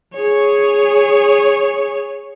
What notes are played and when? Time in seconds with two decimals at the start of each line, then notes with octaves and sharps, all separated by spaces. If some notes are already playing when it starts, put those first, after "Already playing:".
0.14 G#4 C#5